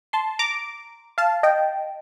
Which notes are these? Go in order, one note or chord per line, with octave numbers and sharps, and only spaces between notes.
A5 C6
A#5 D6
F5 A5
D#5 G5